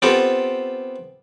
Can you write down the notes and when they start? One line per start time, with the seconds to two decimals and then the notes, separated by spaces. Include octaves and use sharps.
0.02 B3 C4 F4 G4 A4